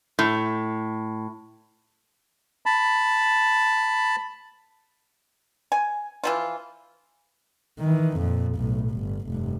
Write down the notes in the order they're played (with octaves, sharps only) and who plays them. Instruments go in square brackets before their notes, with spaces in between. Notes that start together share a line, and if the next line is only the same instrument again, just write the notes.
[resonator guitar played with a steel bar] A2
[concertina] A5 B5
[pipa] G#5
E3 F3 F4
[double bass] D#3 E3
F2 A#2
B1 A2
G1
F1 G2